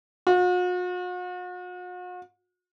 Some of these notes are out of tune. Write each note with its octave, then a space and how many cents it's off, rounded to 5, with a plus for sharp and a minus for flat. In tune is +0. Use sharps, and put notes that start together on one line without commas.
F#4 -45